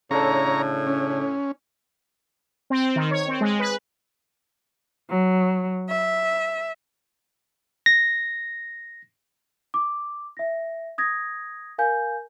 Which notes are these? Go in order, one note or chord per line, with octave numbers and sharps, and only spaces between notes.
A2 C#3 D4 A4 C#5 A#5
C#4
C4
D#3
C#5
C4
G#3
B4
F#3
E5
A#6
D6
E5 A#6
D#6 G#6 A#6
A#4 F5 G#5 G6